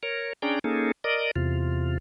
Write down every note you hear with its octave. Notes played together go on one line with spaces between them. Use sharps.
A#4 C#5
C#4 D4 G#4 D5 G5 A#5
A#3 C#4 D#4 G#4 A4
A#4 D5 D#5
E2 C3 F4